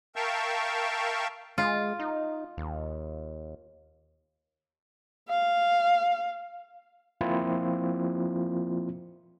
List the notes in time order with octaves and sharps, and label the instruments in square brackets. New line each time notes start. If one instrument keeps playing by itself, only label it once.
[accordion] A#4 E5 F5 G5 A5 C#6
[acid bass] G#3 [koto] F4
[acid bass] D#4
D#2
[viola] F5
[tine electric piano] F3 A#3 C4 E4 F4